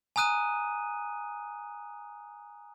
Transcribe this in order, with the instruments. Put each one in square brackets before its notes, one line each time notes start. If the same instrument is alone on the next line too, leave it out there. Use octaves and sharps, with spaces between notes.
[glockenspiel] G#5 A#5 D#6 F#6 D#7